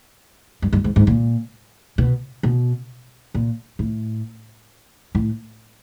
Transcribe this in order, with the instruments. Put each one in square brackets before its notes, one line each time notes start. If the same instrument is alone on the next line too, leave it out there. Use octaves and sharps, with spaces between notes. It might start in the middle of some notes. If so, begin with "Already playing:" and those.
[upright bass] G2
G2
G#2
G#2
A#2
B2
B2
A#2
A2
A2